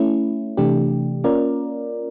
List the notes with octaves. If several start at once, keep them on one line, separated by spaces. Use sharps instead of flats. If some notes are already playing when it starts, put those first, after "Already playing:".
Already playing: A3 C#4 E4
C3 E3 A3 D4 G4
A#3 C#4 F4 A#4 D5